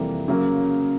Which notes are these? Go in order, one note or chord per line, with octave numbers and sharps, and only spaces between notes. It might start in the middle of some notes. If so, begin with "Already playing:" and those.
Already playing: F2 C3 E3 G3 A#3
C#3 F#3 A#3